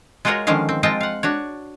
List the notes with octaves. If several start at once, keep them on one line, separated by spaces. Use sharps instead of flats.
G#3 F4 F#4 A#4 C#5 D#5
D3 D#3 F3 G#3 C#4 F5
C4
G#3 C4 F4 D#5 G5 A5
F5 F#5
D4 F#4 C#5